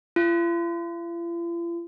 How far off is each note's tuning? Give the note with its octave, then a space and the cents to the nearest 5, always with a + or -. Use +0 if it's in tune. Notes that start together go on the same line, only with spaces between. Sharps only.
F4 -45